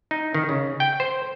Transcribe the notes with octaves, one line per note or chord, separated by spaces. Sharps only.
D#4
D#3
C#3
G5
C5